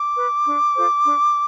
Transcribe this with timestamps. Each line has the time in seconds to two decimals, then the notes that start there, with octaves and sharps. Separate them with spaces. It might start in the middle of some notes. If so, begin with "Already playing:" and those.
Already playing: D6
0.16 B4
0.46 D4
0.75 F4 A4 C5
1.05 D4